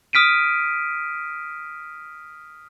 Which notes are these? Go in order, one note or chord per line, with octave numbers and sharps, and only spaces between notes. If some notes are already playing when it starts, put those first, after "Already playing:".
D#6 F6 B6 D7 D#7